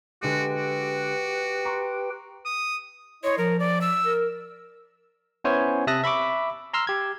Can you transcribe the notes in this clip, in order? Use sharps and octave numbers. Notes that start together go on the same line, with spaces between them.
D3 G#3 F#4 G4 B4 G5
F#4
A#5 C6 C#6
D#6
E4 C#5 D#5 C6
F3 A#4
D5
E6
A#4
B3 C#4 E4 C5 C#5 G#5
C3 E5 A5 D#6 F#6 A#6
E5 B5 C#6 D6
A#5 C6 E6 F6
G4 G#6